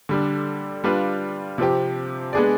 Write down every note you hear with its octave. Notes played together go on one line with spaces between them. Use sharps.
D3 G3 D4
G3 D4 F4 B4 F5
C3 F3 C4 G4
G#3 B3 D4 G#4 D5